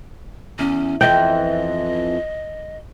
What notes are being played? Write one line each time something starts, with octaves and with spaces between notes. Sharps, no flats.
E2 C#4
F2 E3 B3 D#5 G5